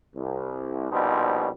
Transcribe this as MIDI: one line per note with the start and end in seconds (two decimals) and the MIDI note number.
0.15 0.91 36
0.91 1.49 34
0.91 1.49 47
0.91 1.49 55
0.91 1.49 63
0.91 1.49 72